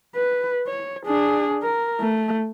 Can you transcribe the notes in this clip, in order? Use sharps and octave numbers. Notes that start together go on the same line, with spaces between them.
B4
C#5
D4 G#4
A#4
A3